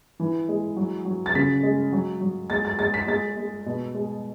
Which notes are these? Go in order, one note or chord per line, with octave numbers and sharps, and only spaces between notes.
E3
G#3
F#3
F#3
A6
C#3 B6
G#3
F#3
F#3
G#3 A6
A6
G#3 A6
B6
G#3 A6
G#3
B2
G#3